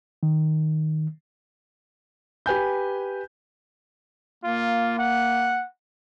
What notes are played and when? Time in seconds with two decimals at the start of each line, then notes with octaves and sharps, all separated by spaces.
0.23 D#3
2.46 G4 B4 G#5 G6
4.44 A#3 F4
4.98 F#5